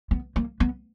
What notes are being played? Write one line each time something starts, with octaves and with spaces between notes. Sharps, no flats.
B3
A#3
B3